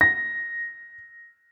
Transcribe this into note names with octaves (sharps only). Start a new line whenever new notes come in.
A#6